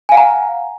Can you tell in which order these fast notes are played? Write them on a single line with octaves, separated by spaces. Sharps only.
G#5 F5 F#5 A#5